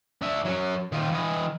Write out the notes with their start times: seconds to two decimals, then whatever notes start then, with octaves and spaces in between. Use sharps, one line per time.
0.22 D4 E5
0.45 F#3 C#4
0.92 D#3 F4
1.11 E3 D#5